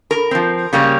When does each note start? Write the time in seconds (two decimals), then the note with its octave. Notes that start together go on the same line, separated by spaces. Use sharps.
0.11 A#4
0.31 F3 C4
0.73 C#3 G3 A#3 C#4